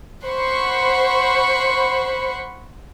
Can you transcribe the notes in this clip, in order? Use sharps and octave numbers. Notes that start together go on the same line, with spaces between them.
C5 F#5 B5 C#6